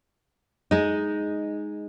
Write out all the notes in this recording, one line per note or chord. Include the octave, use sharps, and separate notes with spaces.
G#3 D#4